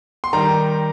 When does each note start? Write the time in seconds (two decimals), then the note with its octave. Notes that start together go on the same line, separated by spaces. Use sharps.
0.24 C6
0.33 D#3 G3 A#5